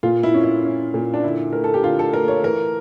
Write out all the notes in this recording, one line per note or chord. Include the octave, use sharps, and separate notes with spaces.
A#2 F4
E4
C#4
E4
C#4
A#2
D4
D3 E4
A3 A#4
A4
G4
D3 F4
A4
A3 A#4
C#5
E3 A#4